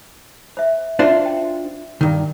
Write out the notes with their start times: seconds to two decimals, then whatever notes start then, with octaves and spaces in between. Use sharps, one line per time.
0.57 C5 E5
0.99 D4 F4 F#4 C5 E5
1.26 G5
2.01 G2 D#3